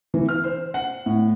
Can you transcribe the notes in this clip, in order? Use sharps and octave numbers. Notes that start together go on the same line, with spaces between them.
E3
F6
C5
F#5
A2